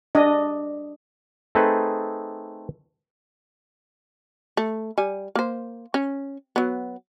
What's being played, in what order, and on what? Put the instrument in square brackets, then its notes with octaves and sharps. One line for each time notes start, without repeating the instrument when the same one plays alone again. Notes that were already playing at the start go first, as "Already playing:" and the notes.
[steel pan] D4 D#5
[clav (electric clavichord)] A3 C4 D#4 G#4 A4 B4
[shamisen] A3
G3 G#5
A#3 C5
C#4
F#3 B3